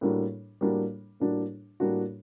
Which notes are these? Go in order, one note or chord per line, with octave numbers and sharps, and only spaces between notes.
A2 G3 A#3 D4 F#4
A2 G3 A#3 D4 F#4
A2 G3 A#3 D4 F#4
A2 G3 A#3 D4 F#4